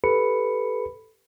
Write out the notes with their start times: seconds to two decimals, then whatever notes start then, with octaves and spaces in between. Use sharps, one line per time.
0.04 G4 A4 B4 B5 C#7